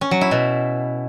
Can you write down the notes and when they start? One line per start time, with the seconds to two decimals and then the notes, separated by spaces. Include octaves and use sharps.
0.01 C#4
0.11 F#3
0.21 E4
0.31 B2